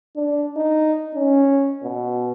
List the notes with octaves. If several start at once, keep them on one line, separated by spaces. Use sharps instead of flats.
D4
D#4
C#4
B2